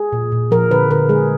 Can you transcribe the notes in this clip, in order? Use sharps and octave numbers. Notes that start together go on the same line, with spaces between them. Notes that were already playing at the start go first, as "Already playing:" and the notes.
Already playing: G#4
A#2
A#2
F3 A#4
D3 B4
D3 A#4
G#3 G#4